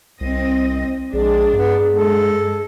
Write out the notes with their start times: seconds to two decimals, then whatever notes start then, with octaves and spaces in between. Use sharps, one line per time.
0.21 C2 C4 D#5
1.13 A#1 G#3 D4 G#4
1.53 G2 B3
1.93 G#3 A4